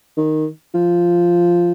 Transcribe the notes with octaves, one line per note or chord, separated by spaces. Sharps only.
D#3
F3